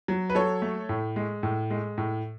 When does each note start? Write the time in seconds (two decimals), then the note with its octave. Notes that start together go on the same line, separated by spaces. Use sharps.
0.08 F#3
0.30 B4
0.35 F#3 A4 C#5
0.62 A3
0.89 A2
1.16 G#3
1.43 A2
1.70 G#3
1.98 A2